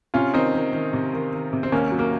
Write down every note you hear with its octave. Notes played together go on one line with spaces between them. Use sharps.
C3 C#4 F4
D#3 C4 D#4
D#3
D#3
C3
D#3
D#3
C3
C4
D#2 A#3 C#4
F#3
A#3